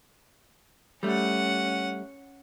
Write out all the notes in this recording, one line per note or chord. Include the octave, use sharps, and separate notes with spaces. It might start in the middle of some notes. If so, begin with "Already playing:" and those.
G3 A3 C#4 F#5